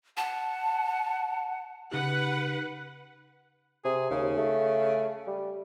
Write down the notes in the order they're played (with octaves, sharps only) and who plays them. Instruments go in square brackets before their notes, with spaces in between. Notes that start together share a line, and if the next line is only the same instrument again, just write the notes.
[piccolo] F#5 [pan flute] A5
[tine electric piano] C#3 D#4 G4 [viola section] B4 F#5
[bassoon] C3 [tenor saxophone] G#4
[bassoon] D#2 [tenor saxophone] C#3
[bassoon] A3
G3